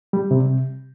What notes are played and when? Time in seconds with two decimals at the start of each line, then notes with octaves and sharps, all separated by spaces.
0.13 G3
0.31 C3